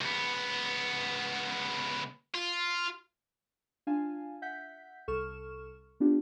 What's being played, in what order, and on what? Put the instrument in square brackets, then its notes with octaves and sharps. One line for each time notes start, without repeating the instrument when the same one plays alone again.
[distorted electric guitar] C#2 B3
F4
[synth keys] D4 F4 F5 G#5 A5
E5 F#5 G6 B6
C2 A4 C#6 F6 E7
B3 D4 F4 G4